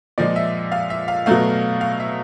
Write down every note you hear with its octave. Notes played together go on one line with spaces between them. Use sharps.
A#2 F3 G#3 D5
E5
F5
E5
F5
B2 F#3 A3 F5
F5
E5